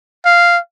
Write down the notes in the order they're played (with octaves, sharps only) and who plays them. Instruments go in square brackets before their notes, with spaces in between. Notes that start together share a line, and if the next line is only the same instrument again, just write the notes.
[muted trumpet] F5